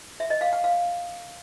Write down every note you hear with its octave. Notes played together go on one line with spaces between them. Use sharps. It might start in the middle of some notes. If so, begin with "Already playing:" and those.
E5
D#5
F5
F#5
F5